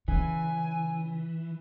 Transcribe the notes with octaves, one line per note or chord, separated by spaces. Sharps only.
C#3 E3 G#5